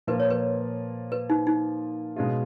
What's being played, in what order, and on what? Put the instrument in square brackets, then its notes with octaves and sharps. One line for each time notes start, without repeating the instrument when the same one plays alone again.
[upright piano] A#2 F3 A#3 F4 [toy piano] B4
[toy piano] C#5
B4
B4
D#4
D#4
[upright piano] B2 G#3 C#4 F4